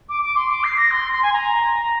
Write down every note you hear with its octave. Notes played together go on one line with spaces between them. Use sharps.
D6
D6
C6
D6
C7
A#6
C6
C6
G#5
A#5